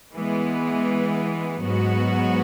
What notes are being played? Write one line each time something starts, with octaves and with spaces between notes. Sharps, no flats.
E3 G#3 B3
G#2 F#3 B3 F#4